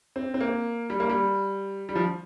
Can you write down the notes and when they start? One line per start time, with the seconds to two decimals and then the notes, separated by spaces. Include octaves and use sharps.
0.16 C4
0.34 C4
0.41 A#3
0.90 G3
1.00 A#3
1.10 G3
1.89 G3
1.95 F3